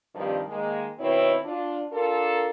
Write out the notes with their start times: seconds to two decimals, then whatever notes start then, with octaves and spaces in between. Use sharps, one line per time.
0.15 G2 C3 D#3 F3 G3
0.48 D#3 G#3 A#3
0.99 B2 D#3 C4 E4 B4 C#5
1.45 D4 F4
1.92 D4 F4 A4 A#4